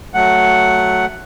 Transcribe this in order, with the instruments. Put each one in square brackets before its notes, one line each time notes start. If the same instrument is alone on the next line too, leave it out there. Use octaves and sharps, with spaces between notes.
[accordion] F#3 A3 F#5